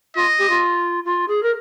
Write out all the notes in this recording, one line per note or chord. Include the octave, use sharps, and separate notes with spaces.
F4 D#5
G4
F4
F4
G#4
A#4